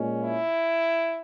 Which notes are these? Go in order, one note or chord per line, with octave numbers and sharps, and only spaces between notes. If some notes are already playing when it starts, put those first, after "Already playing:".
Already playing: A#2 G#3 C#4
E4